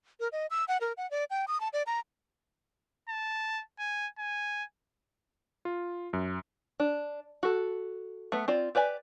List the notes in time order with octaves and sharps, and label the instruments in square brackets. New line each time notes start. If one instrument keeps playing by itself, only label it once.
[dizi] A#4
D#5
E6
F#5
A#4
F#5
D5
G5
D#6
A5
D5
A#5
[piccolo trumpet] A5
G#5
G#5
[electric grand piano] F4
F#2
[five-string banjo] D4
F#4 A4
A3 B3
C4 F4 D5
G4 B4 D5 G#5